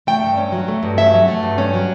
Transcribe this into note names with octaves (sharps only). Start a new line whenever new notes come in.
A3 G5
G2
C#4
F#3
A3
G2
C#4 E5
F#3
A3
G2
C#4
F#3